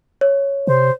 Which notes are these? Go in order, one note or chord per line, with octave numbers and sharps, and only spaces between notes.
C#5
C3 C5